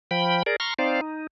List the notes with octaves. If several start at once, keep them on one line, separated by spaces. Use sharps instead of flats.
F3 G5 B5
G#4 A#4 D5
A#5 C6 C#6 F6
C4 D#4 C5 D5 F5
D#4